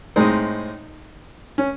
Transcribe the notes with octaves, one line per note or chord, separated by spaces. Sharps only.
A2 G#3 C4 D#4
C#4